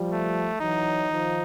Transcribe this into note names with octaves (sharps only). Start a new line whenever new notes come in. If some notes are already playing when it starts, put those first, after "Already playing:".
Already playing: F3 G3
A3
E3 F#3 D#4
D#3 F3